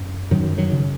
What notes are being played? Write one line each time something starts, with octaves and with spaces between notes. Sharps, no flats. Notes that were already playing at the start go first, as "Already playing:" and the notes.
Already playing: F#2
F#2 D#3 F#3
D#3 F#3
C#3